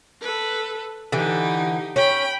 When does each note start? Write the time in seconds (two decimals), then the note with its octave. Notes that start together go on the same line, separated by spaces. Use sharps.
0.22 A4 B4
1.12 D3 E3 D#4 G4
1.96 C#4 G5 B5